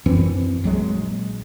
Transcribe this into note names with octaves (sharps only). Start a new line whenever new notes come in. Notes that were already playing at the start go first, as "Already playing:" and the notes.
F#2 E3 C4
A#1 F#3 G#3